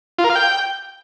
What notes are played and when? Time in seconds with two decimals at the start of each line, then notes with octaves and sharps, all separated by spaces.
0.18 F4
0.24 A#4
0.30 F5
0.35 G5